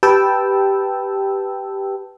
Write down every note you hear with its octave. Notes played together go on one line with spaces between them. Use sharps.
G4 B4 G5 A5 E6